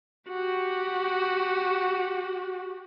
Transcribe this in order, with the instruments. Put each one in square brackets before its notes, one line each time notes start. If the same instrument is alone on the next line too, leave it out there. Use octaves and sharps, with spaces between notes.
[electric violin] F#4 G4